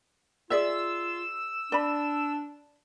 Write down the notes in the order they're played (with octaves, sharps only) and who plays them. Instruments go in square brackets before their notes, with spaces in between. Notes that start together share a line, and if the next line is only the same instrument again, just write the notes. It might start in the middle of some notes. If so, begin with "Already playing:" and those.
[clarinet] F4 [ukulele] G#4 D5 E5 [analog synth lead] E6
[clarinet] D4 [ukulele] D5 B5